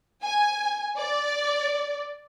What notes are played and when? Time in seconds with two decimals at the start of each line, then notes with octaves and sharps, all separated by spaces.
0.22 G#5
0.97 D5